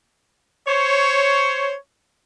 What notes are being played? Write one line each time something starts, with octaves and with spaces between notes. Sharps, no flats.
C5 C#5